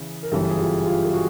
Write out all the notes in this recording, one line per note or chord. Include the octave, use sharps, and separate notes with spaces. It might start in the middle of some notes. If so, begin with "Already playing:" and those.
Already playing: C#3 E3 G#4
A#4
G1 F#2 C#3 E3 G4 A4
G#4
F4 G4
F4 G4
A4
F#4 G#4